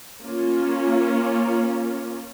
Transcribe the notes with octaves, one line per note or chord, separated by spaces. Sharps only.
A#3 C#4 F4